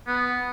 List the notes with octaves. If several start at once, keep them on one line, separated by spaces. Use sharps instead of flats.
B3